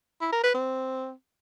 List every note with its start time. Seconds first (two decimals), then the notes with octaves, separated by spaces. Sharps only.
0.21 E4
0.32 A#4
0.43 B4
0.55 C4